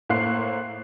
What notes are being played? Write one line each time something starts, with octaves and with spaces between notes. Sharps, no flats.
A2 A3 A#3 C5 F#6 C7